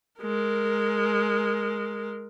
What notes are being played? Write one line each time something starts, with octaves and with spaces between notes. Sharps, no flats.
G#3 A#4